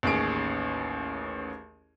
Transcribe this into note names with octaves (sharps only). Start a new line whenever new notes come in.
A1 D#2 C#4 G#4 D7